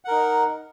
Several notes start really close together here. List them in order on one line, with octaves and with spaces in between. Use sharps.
F#5 A#4 D#4